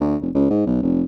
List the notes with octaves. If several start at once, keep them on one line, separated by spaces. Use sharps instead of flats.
D2
F1
C#2
G#2
B1
F1